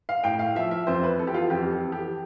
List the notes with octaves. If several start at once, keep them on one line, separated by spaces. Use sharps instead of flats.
F5
A2 G5
F5
F3 E5
E5
F2 C5
B4
E3 A4
G4
F4
F2 G4
A4
E3
G4